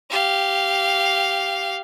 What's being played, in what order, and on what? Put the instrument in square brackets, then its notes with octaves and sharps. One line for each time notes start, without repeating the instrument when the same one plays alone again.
[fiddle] G4 F5